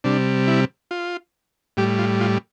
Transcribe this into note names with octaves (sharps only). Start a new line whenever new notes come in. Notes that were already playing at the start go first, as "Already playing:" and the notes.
C3 G3 D4
E4
F4
A2 G3 G4
F4
F4